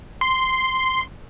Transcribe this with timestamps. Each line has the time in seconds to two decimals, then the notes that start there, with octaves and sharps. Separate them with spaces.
0.21 C6